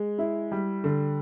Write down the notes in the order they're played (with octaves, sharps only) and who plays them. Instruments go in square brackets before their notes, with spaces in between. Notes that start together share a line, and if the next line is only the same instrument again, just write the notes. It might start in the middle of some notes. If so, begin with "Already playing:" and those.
Already playing: [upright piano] G#3
E4
G3
D3